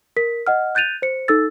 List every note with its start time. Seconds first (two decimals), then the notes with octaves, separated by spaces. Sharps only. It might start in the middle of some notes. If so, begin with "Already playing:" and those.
0.17 A#4 B6
0.47 D#5 F#5 F6
0.75 F#6 G6 A6 D#7 F7
1.02 C5 C#7
1.28 D#4 A4 E6 A6